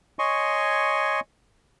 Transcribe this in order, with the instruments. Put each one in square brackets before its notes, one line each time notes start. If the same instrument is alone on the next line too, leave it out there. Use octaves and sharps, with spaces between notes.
[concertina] C#5 D#5 G#5 C6 C#6